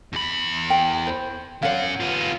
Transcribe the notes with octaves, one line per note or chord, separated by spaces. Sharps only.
E2 B5
G5
C5
F#2 C#5 F5 F#5
B3 F4